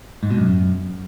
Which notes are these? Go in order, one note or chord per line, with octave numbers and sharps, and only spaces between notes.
G#2
B2
F#2